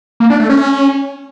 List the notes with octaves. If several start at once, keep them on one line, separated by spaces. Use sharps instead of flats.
A#3
D4
A3
C#4